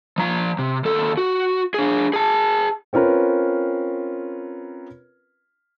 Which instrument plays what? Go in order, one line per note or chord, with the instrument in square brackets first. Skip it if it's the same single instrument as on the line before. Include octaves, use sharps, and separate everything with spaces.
[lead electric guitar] F3 A#5
C3
D#2 A4
F#4
D4 G#4
G#4 A5
[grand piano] C4 C#4 F4 A#4 B4